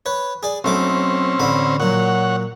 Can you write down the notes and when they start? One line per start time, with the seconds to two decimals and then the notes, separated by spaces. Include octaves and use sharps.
0.06 B4 C#5
0.43 G#4 D5
0.64 B1 A3 C4 C#4 D6
1.40 A1 D3 B5
1.80 A#2 F#3 C#5 F#5